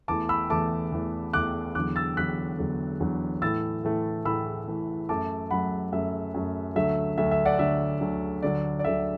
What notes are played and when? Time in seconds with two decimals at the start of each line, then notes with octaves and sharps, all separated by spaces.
0.08 E2 E3 A3 A5 D6
0.29 B5 E6
0.50 E2 E3 A3 A5 D6
0.92 E2 E3 A3
1.33 E2 E3 A3 D6 F#6
1.75 E2 D3 F#3 D6 F#6
1.96 E6 A6
2.17 E2 D3 F#3 F#6 B6
2.59 E2 D3 F#3
3.00 E2 D3 F#3
3.42 A2 E3 A3 E6 A6
3.84 A2 E3 A3
4.25 A2 E3 A3 B5 E6
4.67 A2 E3 A3
5.09 F#2 F#3 A3 A5 D6
5.51 F#2 F#3 A3 F#5 B5
5.92 F#2 F#3 A3 E5
6.34 F#2 F#3 A3
6.76 D2 D3 F#3 A3 E5
7.18 D2 D3 F#3 A3 E5
7.31 E5
7.45 D5 F#5
7.59 D2 D3 F#3 A3 E5
8.01 D2 D3 F#3 A3
8.42 D2 D3 F#3 D5
8.79 D5
8.84 D2 D3 F#3 E5